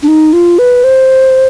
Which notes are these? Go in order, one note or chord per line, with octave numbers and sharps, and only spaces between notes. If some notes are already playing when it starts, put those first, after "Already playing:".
D4
D#4
F4
B4
C5